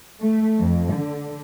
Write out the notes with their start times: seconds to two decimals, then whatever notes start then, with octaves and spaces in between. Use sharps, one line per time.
0.22 A3
0.60 F2
0.94 D3